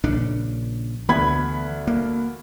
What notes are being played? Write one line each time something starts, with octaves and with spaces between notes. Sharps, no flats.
A#1 C#3 D4
D2 E3 B3 B5 G#6
A#3